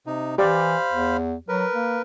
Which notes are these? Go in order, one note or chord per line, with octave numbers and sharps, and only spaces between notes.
C3 D#4
E3 G4 C5 D5 F5 B5
E2
F#3 A#4 B4
A#3